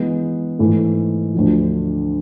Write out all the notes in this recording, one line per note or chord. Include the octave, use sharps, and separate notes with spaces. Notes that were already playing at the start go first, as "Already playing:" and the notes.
Already playing: E3 G#3 B3
G#2 E3 A3
D2 D3 F3